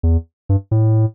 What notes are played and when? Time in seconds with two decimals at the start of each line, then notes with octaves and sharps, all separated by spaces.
0.03 E2
0.49 G2
0.71 A2